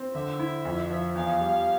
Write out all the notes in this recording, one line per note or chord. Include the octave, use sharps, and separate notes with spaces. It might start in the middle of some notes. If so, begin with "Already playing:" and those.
Already playing: C4
D3 E5
E4
F2
F3
E2 F5
G3